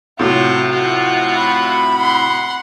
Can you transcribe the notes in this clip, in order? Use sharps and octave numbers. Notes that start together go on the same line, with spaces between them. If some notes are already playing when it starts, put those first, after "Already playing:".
A2 C3 F#3 F4 F#4
F4 F#4
B5
F#5 C6